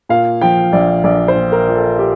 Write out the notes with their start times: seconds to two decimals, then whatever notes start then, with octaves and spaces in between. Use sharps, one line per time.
0.09 A#2 F5
0.41 F3 G5
0.73 A#1 D5
1.04 A#1 D5
1.28 C5
1.35 A#2
1.52 A#4
1.68 F3
1.75 A4
1.99 G4